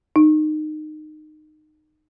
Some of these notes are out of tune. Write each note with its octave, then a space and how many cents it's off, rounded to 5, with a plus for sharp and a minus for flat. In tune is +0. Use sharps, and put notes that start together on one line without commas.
D#4 -20